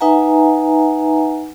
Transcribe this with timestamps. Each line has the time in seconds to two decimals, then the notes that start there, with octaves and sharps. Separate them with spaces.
0.01 D#4 B4 E5 F#5 G#5 A#5